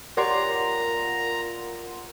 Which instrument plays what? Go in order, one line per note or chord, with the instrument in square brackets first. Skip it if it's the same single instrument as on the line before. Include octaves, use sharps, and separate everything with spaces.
[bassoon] A#2 [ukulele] G4 C#5 D5 [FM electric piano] A#4 F#5 C6 [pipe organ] A#5